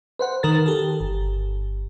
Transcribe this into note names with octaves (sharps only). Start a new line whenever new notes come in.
B4 C5 F#5
D#3 A#4 A6
G4 A4
G1